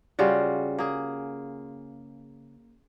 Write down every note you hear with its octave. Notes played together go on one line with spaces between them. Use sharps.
C#3 G3 F4 F#4
A#3 G#4